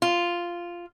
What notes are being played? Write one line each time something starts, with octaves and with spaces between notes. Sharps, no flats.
F4